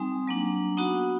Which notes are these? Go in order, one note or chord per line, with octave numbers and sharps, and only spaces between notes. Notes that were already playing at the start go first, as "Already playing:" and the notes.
Already playing: G3 C4 D#4 G#5
F#3 A#3 D4
B3 D#4 F#4 F#5